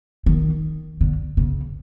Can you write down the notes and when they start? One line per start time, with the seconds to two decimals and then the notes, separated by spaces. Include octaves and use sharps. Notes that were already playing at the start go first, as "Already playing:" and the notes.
0.26 D#3
1.01 D3
1.37 C#3